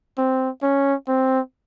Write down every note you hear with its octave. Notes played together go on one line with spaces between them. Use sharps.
C4
C#4
C4